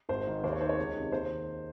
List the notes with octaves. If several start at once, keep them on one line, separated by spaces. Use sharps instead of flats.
G#1 C5
G#2 D#3
D#2 C5
C#5
D#3 C5
C#5
C#2
C3 D#3
D#2 C5
D#3